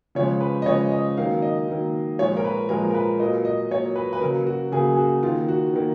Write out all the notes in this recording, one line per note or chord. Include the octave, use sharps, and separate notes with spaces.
C#3 F3 G#3 C#5
B4
D#5
C#3 F3 G#3 C#5
D#5
D#3 F#3 A#3 F5
D#5
D#3 F#3 A#3
A#2 F3 G#3 C#5
A#4
B4
A#2 F3 G#3 A#4
A#4
B4
A#2 F#3 A#3 D#5
D#5
A#2 F#3 A#3 C#5
B4
B4
C#3 F#3 A#3 A#4
F#4
C#3 F#3 A#3 G#4
G#4
F#4
D#3 A#3 F4
F#4
D#3 A#3